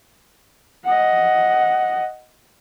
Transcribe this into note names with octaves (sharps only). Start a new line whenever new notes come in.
D#5 F#5